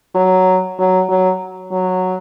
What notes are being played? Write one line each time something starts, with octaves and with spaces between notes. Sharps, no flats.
F#3
F#3
F#3
F#3